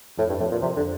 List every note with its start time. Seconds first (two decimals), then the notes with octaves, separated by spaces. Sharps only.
0.18 F2 A2
0.29 G2
0.40 F2 A2
0.52 A#2
0.62 F2 C3
0.76 D3